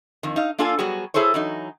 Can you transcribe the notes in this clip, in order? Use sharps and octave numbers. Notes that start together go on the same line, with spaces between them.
F2 D#3
D#4 F5
A#3 D4 F4 A4 F5 G#5
F#3 G3 B3 F#4 G#4
E4 G#4 A4 C5 C#5
E3 F#3 D#4